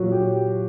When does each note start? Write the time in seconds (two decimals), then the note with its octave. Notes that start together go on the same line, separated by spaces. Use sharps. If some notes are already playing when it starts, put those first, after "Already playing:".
Already playing: A#2 F#3 F#4
0.12 G4